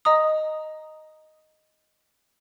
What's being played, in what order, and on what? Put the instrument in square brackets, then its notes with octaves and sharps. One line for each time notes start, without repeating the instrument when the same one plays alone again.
[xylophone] D#5 A#5 D#6